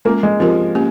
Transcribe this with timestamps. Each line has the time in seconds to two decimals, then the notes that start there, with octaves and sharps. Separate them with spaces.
0.05 G#3 A#3 C#4 F4
0.23 G#3
0.40 F3 C4 G4 A#4
0.75 A#3 C#4 G4